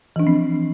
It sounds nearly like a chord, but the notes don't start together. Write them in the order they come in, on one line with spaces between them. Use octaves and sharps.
E3 D4 F3 C4